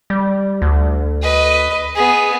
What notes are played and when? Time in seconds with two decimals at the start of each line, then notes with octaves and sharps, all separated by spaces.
0.10 G3
0.62 D2
1.22 B4 D#5
1.95 B3 G#4